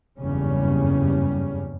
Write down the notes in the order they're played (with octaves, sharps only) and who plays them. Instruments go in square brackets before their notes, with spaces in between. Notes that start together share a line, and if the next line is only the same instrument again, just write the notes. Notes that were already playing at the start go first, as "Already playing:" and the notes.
[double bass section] F#1 E2 G2 C#3 G3 C#4